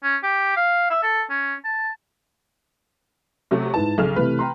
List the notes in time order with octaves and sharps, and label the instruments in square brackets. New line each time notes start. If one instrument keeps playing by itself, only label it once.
[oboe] C#4
G4
F5
E5
A4
C#4
A5
[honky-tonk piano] C3 F#3 A3
[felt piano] G#2 E4 B4 [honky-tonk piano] A5
[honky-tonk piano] B1 G#4 F6 [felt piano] C#3 A4
[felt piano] C3 E3 A3 [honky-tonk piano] B4
[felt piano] G5 A#5 C6